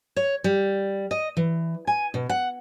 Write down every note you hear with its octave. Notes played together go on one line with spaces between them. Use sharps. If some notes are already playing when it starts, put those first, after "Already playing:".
C#5
G3
D#5
E3
G#5
B2
F#5